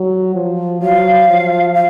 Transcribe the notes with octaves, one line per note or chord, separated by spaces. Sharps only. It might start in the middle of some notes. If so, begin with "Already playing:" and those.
Already playing: F#3
F3
F#3 F5
F3
F5